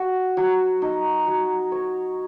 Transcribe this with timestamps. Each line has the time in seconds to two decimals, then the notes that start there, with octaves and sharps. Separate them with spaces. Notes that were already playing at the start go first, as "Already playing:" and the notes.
Already playing: F#4
0.37 F#3
0.82 D#4
1.27 F#3
1.72 C#5